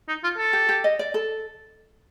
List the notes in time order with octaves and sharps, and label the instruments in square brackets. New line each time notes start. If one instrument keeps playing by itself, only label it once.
[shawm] D#4
F4
A4
[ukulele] G4
G4
D#5
D5
A4